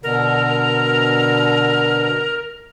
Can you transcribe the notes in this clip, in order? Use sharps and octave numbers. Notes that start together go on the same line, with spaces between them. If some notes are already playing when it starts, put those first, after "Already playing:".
B2 D3 A#4